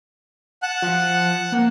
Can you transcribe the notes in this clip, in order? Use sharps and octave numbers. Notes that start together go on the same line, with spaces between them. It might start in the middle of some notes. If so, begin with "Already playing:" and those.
F#5 A5 F#6
F3
A#3